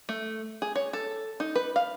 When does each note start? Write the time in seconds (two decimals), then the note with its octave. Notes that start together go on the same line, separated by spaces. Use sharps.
0.09 A3
0.62 G#4
0.76 C#5
0.93 A4
1.40 D#4
1.56 B4
1.76 F5